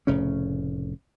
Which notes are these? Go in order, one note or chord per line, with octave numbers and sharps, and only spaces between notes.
F1 A2 C#3 C#4